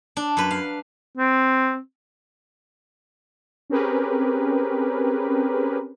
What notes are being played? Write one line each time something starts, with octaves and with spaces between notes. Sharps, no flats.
D4
F#2 B4
F5
C4
C4 C#4 G4 G#4 A#4 B4